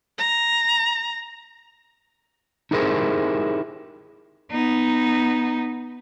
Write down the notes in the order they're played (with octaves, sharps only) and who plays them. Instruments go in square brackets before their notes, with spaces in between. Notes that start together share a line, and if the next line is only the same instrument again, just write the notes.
[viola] A#5
[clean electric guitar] D#4 E4 G4 G#4 A#4 C5
[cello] B3 D#4